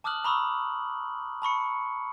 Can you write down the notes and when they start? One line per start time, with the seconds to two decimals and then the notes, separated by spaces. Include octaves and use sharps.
0.04 A5 D6 D#6 F6 F#6 F#7
0.25 A#5 B5 C#6 D#6 E6
1.42 A5 B5 C#6 C#7